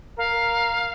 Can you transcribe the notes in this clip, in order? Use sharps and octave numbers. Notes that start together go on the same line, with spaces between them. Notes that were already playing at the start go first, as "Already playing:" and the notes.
A#4 F5